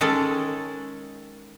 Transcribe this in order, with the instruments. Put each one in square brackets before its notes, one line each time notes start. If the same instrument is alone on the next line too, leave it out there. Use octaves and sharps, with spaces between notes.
[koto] D#3 G#3 C#4 A4